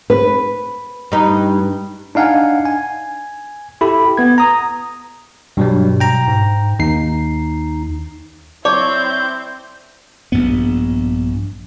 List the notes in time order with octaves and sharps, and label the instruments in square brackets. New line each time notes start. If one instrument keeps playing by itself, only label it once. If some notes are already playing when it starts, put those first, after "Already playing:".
[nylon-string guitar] B4
[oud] G2 D#4
[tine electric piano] D4 D#4 F5 F#5 G#5
G#5
E4 G4 A4 B5
B3 G#6
A#5 D#6
[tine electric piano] G2 F#3 G3 [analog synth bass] B2
[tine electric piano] G5 A#5
[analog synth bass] G#2
[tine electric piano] D#2 C7 [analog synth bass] D#4
[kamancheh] C4 E4 [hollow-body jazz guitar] C#5 [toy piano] D5 A5 D6 [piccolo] G6
[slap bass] A#1 G2 B3